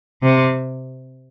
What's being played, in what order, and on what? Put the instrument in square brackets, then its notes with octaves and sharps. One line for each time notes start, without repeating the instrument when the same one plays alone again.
[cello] C3